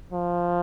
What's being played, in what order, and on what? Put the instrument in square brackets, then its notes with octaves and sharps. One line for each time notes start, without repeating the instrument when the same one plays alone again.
[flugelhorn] F3